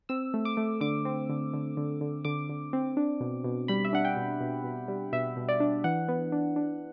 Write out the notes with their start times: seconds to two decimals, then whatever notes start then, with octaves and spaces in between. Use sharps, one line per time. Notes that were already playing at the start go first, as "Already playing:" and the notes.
0.09 C4 E6
0.34 A3
0.45 D6
0.57 A3
0.81 D3 D6
1.05 C4
1.29 D3
1.54 D3
1.77 D3
2.01 D3
2.25 D3 D6
2.49 D3
2.73 C4
2.97 D4
3.20 B2
3.44 B2
3.68 G3 B5
3.85 E5
3.93 D4 F#5
4.05 G5
4.17 B2
4.41 B2
4.64 B2
4.88 G3
5.13 B2 E5
5.36 B2
5.48 D5
5.60 D4
5.84 E3 F#5
6.08 B3
6.32 D4
6.56 D4